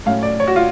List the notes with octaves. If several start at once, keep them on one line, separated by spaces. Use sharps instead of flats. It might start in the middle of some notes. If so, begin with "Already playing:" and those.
A2 F#3 C#4 F5
D5
C#5
F#4
F4